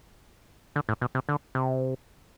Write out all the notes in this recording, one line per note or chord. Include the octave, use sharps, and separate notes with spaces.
D3
A2
B2
C3
D3
C3